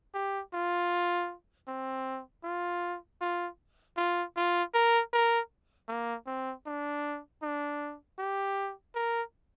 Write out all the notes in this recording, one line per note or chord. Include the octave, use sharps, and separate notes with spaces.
G4
F4
C4
F4
F4
F4
F4
A#4
A#4
A#3
C4
D4
D4
G4
A#4